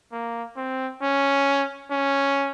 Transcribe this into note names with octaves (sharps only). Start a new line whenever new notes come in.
A#3
C4
C#4
C#4